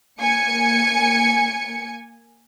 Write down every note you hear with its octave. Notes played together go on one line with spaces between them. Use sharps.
A#3 G#5 C#7